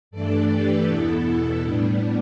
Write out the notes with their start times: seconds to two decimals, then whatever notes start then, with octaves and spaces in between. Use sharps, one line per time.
0.11 G2 E3 A3 D4 A4 D5
0.49 G4 B4
0.87 E2 B2 B3 E4 A4
1.24 E4 A4
1.63 A2 G3 B3 D4